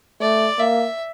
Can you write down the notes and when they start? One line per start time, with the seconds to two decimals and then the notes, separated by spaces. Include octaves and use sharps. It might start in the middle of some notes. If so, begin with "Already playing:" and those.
0.20 A3 D5
0.59 A#3 E5